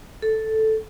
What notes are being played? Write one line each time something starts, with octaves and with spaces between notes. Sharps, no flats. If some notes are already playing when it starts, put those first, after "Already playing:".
A4